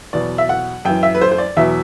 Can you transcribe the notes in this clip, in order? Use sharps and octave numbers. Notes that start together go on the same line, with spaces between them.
E2 B2 F#3 D5
E5
F#5
F#2 E3 G5
E5
B4
C5
C5
D5
E2 B2 F#3 E5